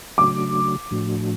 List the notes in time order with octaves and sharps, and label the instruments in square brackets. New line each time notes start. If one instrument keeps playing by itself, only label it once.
[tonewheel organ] C#3 F#3 A3 D4 F#4 [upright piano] D6
[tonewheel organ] A2 F3 A3 D4 F#4